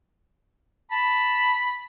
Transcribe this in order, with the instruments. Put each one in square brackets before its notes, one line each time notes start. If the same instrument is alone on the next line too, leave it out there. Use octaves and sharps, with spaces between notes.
[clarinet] A5 [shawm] B5